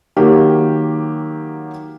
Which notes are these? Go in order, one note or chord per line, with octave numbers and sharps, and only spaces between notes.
D#3 F#3 A#3 G4